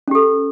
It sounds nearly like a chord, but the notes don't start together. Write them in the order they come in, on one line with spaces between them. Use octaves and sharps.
C#4 G4 A4